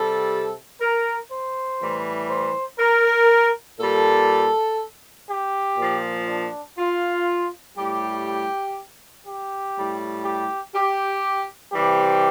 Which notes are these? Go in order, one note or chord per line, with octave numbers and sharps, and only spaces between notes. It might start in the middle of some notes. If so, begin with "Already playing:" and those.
Already playing: C3 G3 A4
A#4
C5
A2 E3 G3
C5
A#4
A#2 G3 A4
G4
A#2 F3
D4
F4
A2 G3 G4
G4
A2 G3
G4
G4
C3 E3 G3 G4